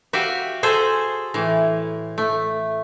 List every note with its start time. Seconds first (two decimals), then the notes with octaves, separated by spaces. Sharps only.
0.13 F#4 G4 E5 F5
0.63 G#4 A4 C5
1.34 A2 E3
2.18 A3